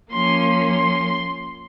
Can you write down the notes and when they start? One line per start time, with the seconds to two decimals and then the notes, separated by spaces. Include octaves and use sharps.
0.12 F3 A#3 C#4 C6
0.66 C6